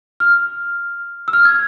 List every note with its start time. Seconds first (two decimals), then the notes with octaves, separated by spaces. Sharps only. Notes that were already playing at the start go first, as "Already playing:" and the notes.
0.20 F6
1.28 E6
1.33 F6
1.45 G#6